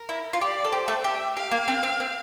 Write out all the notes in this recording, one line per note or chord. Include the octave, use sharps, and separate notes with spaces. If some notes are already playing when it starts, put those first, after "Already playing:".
Already playing: A#4
E4
F4
G4 D5
A4
G4 C5
A3 A4
G4 E5
G4 F5
A#3
C4
C4
C4